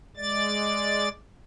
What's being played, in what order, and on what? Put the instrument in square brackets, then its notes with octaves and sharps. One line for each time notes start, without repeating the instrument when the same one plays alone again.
[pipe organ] G#3 D5 A6